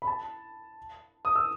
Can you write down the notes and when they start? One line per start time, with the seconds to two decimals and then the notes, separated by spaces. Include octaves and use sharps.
0.02 B5
0.07 A5
1.25 D#6
1.36 E6